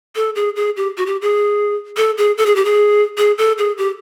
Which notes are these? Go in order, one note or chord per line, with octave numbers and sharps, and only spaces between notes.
A4
G#4
G#4
G4
F#4
G4
G#4
A4
G#4
A4
G#4
G4
G#4
G#4
A4
G#4
G4